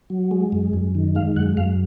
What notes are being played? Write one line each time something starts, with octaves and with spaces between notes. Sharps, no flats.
F#3
G#3
F#2
F#2
D#3
G#3 F5
F#2 F#5
F#2 F5